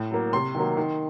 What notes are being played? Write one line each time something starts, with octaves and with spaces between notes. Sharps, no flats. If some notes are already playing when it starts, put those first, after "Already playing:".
Already playing: A2
F#3 A#3
C3 C6
D#3 F#3 A#3
D#3